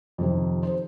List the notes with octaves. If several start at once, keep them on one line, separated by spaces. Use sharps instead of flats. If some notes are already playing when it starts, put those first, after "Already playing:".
F2 C3 D#3
C5